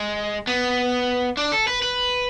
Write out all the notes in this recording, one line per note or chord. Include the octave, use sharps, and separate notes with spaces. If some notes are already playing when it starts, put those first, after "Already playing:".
Already playing: G#3
B3
D4
A4
B4
B4